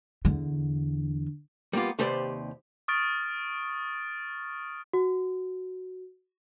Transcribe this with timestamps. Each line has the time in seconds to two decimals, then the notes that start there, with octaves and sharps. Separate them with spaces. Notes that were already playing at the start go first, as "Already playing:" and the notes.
0.25 E2 D3
1.73 G3 A#3 B3 F4
1.99 D#2 C3 G4 B4 C5 D5
2.88 C#6 D#6 F6 A6 D7
4.93 F#4